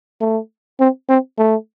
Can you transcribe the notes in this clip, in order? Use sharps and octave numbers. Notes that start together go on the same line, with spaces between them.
A3
C4
C4
A3